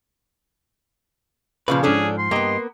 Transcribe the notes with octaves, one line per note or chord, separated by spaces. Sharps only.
A#2 C#3 F3 B4
G#2 F3 C#4 D4 G#4 A4
C6
G2 A#3 B3 G4 D#5